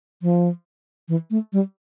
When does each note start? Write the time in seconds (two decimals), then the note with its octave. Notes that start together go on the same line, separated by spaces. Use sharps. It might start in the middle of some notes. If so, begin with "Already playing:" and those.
0.22 F3
1.09 E3
1.31 A3
1.53 G3